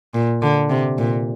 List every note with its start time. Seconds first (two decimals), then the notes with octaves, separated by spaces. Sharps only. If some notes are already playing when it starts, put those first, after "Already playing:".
0.14 A#2
0.42 D3
0.70 C3
0.98 A#2